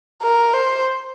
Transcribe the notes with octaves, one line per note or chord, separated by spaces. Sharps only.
A#4
C5